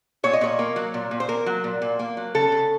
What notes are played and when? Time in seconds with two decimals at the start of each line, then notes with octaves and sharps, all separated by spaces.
0.24 A#2 C#5
0.33 D#5
0.41 A#2 C#5
0.59 A#3
0.76 F#3
0.94 A#2
1.11 A#2
1.20 C5
1.29 A#3 A#4
1.46 F#3
1.64 A#2
1.82 A#2
1.99 A#3
2.17 F#3
2.35 C#3 A4
2.52 C#3